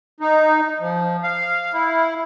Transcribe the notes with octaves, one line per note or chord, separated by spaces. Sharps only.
D#4
F3
F5
E4